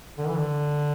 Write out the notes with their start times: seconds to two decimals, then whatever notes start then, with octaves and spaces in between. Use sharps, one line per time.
0.18 D3
0.28 E3
0.38 D3